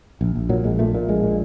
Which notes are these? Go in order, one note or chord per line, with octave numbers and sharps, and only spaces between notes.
A#1
A#1
A#2 F#3
A#1 G#3
A#2 A3
A#2
A#1 G#3
A#2